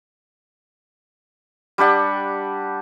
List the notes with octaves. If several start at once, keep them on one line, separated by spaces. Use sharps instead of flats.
G3 D4 G4 F#5